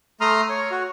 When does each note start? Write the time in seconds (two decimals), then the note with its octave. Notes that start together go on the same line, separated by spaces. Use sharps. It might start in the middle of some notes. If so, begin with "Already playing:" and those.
0.21 A3 A#5 C6 D#6 F6
0.49 C#5
0.71 F#4